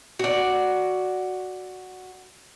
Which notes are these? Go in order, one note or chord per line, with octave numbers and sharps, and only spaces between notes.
F#4 D5